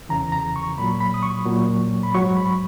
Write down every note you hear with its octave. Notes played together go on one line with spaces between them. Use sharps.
E2 C#3 E3 A#5
A#5
C#6
A#2 F#3 B5
B5
D#6
C#6
A#2 F#3
B5
G#2 F#3 C#6
B5